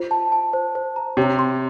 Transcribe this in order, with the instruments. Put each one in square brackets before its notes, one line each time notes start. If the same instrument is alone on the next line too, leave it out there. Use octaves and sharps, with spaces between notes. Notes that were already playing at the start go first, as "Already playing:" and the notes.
Already playing: [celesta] F4 C5
A5
A5
C5
C5
A#5
[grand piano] C3 [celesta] C#5
[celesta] C6